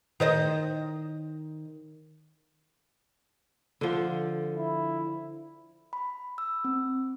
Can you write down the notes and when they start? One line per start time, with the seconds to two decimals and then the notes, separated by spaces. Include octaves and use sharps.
0.20 D#3 C5 D#5
3.81 D3 F3
4.57 E4
5.93 B5
6.38 E6
6.65 C4